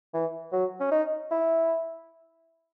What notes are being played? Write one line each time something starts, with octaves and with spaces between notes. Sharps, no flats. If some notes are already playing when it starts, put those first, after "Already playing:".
E3
F#3
C#4
D#4
E4